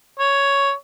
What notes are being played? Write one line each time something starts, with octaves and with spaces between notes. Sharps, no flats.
C#5